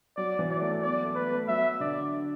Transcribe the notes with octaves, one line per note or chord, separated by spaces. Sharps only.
F#3 D5
E3
F#3 D5
A3
A3
B3 D5
A3
B3 B4
A3
F#3 E5
D3 D5